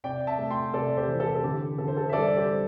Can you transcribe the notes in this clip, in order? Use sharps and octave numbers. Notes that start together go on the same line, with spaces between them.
C3 D5 G5
E5 A5
A3
G5 C6
C3 A4 D5
G4 C5
E3
A4
A4
D3 G4
D3 A4
C5
A4
E5
G3 A4 D5
G4 C5
G3